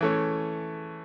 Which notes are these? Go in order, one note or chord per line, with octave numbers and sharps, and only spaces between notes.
E3 A3 C#4